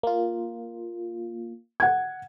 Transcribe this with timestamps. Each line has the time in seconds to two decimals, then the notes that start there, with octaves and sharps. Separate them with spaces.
0.03 A#3 F4
1.80 F#5 G#6